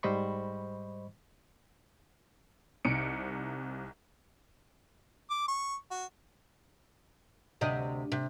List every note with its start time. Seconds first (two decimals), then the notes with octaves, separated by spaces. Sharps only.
0.03 G#2 G3 C5 D#5 B5 C#6
2.85 C2 C3 D#4 C#7 D7
5.30 D6
5.48 C#6
5.91 F#4
7.61 D2 C3 D#5
8.12 C3